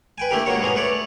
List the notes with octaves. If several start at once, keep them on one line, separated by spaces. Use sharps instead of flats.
B4 G5 G#5
A3 A#3 D4 E4 G4 A#4
C#2 C#3 A#3 F#4 C#5
A#1 B3 C#4 G#4 A#5
A3 B4 C#5 D5